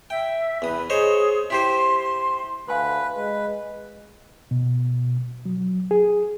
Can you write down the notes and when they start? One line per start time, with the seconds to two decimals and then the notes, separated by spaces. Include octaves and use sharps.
0.10 E5 G5
0.62 E2 B4 D#6
0.90 G#4 C5 C#5 D#5
1.50 E4 G4 C5 C6
2.69 D2 B4 F5 G#5 C6
3.16 G#3 B4
4.51 B2
5.46 F#3
5.91 G#4